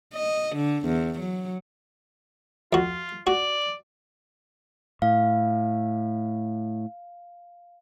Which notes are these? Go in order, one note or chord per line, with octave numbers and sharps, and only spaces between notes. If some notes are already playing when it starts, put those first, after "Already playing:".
D#5
D3
E2
F#3
F2 F4 F#4
F#4 D5
A2 F5